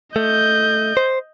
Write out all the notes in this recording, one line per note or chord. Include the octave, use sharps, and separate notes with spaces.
A3 D#5 G6
C5